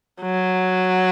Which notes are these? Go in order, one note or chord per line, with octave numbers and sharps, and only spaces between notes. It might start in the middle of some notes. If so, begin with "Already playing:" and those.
F#3